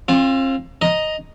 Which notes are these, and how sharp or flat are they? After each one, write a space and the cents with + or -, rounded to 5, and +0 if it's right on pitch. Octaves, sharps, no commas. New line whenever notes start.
C4 +40 F4 +0
D#5 +0 A#5 +10 D#6 +0